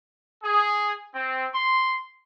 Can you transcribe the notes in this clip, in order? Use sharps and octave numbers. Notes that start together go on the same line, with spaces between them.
G#4
C4
C6